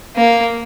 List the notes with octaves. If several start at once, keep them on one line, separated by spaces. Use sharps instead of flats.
A#3